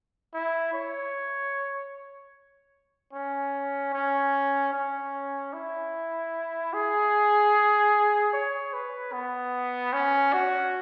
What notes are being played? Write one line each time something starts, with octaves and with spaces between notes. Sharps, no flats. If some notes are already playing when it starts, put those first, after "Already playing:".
E4
C#5
C#4
C#4
C#4
E4
G#4
C#5
B4
B3
C#4
F#4